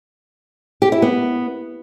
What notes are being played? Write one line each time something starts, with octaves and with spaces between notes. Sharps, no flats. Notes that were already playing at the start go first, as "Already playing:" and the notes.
G4
E4
B3